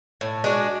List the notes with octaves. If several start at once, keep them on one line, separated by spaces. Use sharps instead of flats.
A2
G#3 D4 F#4